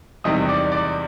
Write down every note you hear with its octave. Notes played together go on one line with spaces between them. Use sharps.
E2 C3 D#3 G3 D#5 D#6
D5 D6
D5 D6